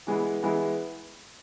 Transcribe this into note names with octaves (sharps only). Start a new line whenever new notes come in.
E3 G#3 B3 E4
E3 G#3 B3 E4